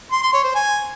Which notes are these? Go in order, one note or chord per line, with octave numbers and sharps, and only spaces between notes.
C6
C6
C#5
C5
G#5